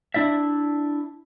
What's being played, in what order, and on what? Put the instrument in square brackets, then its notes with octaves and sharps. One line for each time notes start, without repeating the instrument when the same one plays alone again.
[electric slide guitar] D4 E4 D5 E5